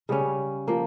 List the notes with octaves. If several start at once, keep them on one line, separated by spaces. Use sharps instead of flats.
C#3 G3 C#4
F3 A#3